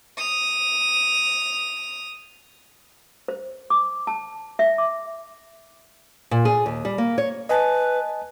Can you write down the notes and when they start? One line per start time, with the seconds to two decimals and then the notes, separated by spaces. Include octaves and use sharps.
0.18 D#6 F7
3.28 C5
3.70 D6
4.07 A5
4.59 E5
4.78 D6
6.31 A#2
6.45 G#4
6.66 D#2
6.85 G3
6.98 A#3
7.18 C#5
7.49 B4 D#5 G#5 A5